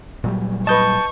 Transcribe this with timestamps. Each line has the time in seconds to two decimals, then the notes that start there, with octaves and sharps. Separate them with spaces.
0.24 A#2 F#3 G3
0.67 B4 D#5 A5 C#6 G6